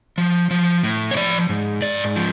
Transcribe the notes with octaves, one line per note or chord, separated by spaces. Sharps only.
F3
F3
A2
C#5
F3 D5
G#2
G#2 D5
F3